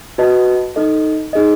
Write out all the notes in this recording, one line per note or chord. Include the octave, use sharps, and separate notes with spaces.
F#4 B4 D#5 A5
D#4 A4 D#5
D#4 G#4 D#5